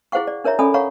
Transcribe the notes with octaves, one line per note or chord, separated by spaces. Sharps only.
E4 G#4 C5 F5 F#5 C#6
D5
D4 A#4 C#5 E5 A#5
C#4 A4 D5 G#5 B5 D#6
C#5 F5 F#5 A#5 C#6